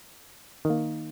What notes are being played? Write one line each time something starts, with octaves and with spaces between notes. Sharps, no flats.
D#3
A#3